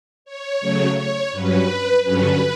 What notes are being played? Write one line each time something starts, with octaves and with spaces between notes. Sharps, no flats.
C#5
C#3 F#3 A3
C#5
G2 F#3 C#4 B4
G2 D3 F#3 C#4 B4